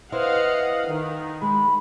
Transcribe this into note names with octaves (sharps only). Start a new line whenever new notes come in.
E4 B4 C5 D#5 F5 F#5
D#3
G#3 B5